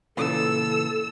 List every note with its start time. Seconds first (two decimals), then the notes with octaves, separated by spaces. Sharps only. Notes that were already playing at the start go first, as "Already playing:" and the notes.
0.17 A#2 C#3 E3 A4 E6